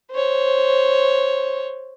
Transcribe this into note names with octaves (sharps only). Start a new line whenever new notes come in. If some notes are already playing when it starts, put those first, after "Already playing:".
C5 C#5